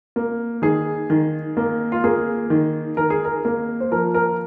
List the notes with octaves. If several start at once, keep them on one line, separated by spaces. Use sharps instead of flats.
A#3
D#3 G#4
D#3
A#3
F4
A#3 G#4
D#3
D#3 A#4
G#4
A#4
A#3
C5
F3 A#4
A#4